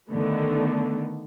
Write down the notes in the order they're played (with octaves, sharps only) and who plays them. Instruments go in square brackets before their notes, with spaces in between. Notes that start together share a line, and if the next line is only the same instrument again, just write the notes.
[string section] D3 D#3 A3 B3